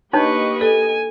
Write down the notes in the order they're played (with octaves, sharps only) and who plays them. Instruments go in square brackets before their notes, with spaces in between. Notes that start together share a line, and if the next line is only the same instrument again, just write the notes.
[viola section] A#3 G4 D#5 [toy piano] D4 D#4 C#5 [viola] B4 C#6
[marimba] A4 [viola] G#5